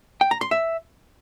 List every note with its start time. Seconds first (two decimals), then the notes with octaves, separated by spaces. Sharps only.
0.21 G5
0.31 A#5
0.41 C6
0.51 E5